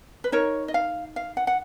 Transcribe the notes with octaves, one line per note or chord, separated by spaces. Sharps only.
B4
D#4 A#4 C#5
D#5
F5
F5
F#5
F#5